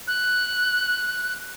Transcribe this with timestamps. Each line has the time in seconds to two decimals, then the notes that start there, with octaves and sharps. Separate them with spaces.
0.07 F#6